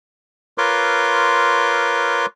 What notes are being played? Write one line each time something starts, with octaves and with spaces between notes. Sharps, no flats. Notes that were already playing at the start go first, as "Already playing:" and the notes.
F4 A#4 B4 C#5 C6 D6